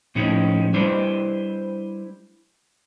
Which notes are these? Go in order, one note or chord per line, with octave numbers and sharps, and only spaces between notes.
A2 F3 C#4 D#4 E4
G3 D4 E4 B4 C5